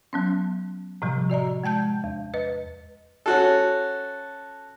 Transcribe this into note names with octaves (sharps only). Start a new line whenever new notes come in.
F#3 B3 C#4
A2 C3 F3 G3
F#4 D5 D#5 A#5
G#3 G5 A5 G6
E2
B4 D#5
C#4 F#4 A4